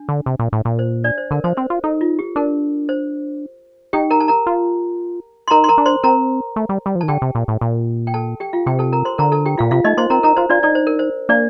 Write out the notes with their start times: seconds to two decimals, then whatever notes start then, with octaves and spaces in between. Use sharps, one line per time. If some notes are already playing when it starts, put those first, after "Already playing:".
Already playing: D4
0.09 D3
0.26 C3
0.39 A#2
0.53 A2
0.65 A#2
0.79 C5
1.04 D4 D5
1.18 C5
1.31 D3 A#4
1.44 F3 C5
1.57 C4 C5
1.70 F4
1.84 D#4 A4
2.01 F4
2.19 G4
2.36 D4 A#4
2.89 C5
3.93 D#4 G4 G5
4.11 A#4 A#5
4.20 A5
4.28 A#4 A#5
4.47 F4
5.48 C6
5.51 D#4 A#4 A#5
5.64 C6
5.68 A#4 A#5
5.78 D4
5.86 C5 C6
6.03 C4 A#4 A#5
6.56 A3
6.69 G3
6.86 G3
6.95 F3
7.01 D#3 A5
7.08 D3 G4 G5
7.22 C3
7.35 A#2
7.48 A2
7.61 A#2
8.07 G5
8.14 A4 A5
8.40 G4 G5
8.53 F4 F5
8.66 C3 G4 G5
8.79 A4 A5
8.93 A#4 A#5
9.05 C5 C6
9.18 D3 A#4 A#5
9.32 A4 A5
9.46 G4 G5
9.58 A#2 F4 F5
9.71 C3 F4 F5
9.84 A3 D#4 D#5
9.97 A#3 C5 C6
10.10 C4 A#4 A#5
10.23 D#4 A#4 A#5
10.36 F4 C5
10.50 D4 F4 D5
10.63 D#4 D5
10.75 C5
10.87 A#4
10.99 C5
11.29 A#3 D4 D5